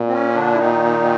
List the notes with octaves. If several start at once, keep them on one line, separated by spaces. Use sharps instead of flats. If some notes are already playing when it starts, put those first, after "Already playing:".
Already playing: A#2
C4
C#4
D3 D4
E4
D#3 D#4